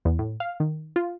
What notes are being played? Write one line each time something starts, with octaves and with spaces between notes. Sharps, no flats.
E2
A2
F5
D#3
F4